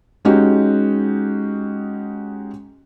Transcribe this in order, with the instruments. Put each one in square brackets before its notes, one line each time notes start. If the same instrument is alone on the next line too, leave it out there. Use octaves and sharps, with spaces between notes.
[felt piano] G#3 C#4 D#4 F#4 G4